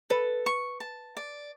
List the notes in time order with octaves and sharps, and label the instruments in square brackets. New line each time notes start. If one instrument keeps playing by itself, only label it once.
[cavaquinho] A4 [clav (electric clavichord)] B4
[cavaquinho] C#6
A5
D5